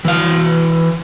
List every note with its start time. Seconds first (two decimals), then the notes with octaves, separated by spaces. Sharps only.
0.05 E3 F5